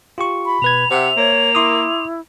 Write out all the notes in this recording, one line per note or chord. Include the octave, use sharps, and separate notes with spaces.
F4 G4 C#6
B5
B2 B4 G#6 F7
C3 C5 E5 F#5
A#3 C#5
E4 C6 D6 D#6